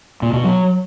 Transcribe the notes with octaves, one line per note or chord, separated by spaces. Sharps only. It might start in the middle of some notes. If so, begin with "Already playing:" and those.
A#2
B2
F#3